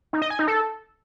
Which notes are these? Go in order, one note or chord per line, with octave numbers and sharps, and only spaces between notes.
D#4
D#5
G#5
D#4
A4